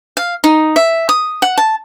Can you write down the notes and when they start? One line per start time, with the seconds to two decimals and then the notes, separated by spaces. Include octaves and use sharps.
0.17 F5
0.44 D#4
0.76 E5
1.09 D#6
1.42 F#5
1.58 A5